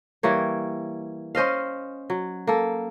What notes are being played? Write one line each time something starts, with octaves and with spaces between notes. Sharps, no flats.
E3 G3 A#3 C#5
C#4 C5 D#5 F5
F#3
A#3 A4